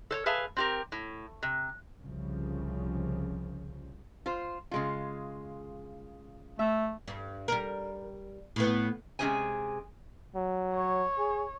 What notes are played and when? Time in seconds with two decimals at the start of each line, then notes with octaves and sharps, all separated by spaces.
0.11 A4 C5 C#5
0.26 G#4 B4 E5 F5 A5
0.57 C4 G4 A#4
0.92 A2
1.43 C3
2.02 C2 C#3 F3
4.26 F4 C5
4.71 C#3 G#3 F4
6.59 A3 E5
7.08 G2
7.48 G3 A#4
8.56 A2 B3
9.19 C3 G#3 C#4 G#4 C5 G#5
10.35 F#3
10.75 C#5
11.18 G#4